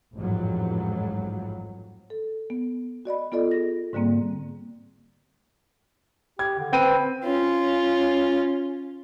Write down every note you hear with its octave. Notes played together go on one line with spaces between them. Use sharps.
A1 F2 G#2 F#3 G3
A4
B3
F#4 D5 D#5 B5
B3 F4 A4 D5 D#5
G#4 A#6
G#2 D3 G3 A#3 C4
G4 G#6
D3
C4 B4 G5 D#7
C#4 F4